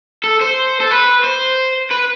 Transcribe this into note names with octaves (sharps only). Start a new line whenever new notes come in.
A4
C5
A4
B4
C5
B4